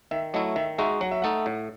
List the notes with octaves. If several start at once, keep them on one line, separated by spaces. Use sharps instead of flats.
D#3 E5
F#3 A3 E4 D#5
D#3 E5
G#3 D#4 F#4 E5
F#3 F#5
E5
A3 D#4 A4 F#5
A2